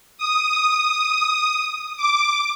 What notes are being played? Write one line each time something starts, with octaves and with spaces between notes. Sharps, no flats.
D#6
D6